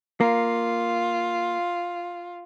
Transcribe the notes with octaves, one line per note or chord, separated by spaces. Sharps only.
A#3 F4